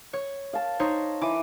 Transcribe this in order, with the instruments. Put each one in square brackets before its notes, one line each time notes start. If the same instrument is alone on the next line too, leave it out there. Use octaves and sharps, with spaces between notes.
[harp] C#5
[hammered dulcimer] F5 A5
[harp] D#4 C5 C#5
[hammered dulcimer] E3 [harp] D6 D#7